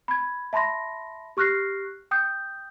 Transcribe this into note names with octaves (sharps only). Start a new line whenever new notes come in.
B5 G#6
E5 A5 B5 C6 A#6
G4 C#6 F6 F#6 A#6 C7
G5 D#6 G6